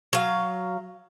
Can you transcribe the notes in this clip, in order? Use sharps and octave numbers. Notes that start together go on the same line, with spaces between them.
F#3 F5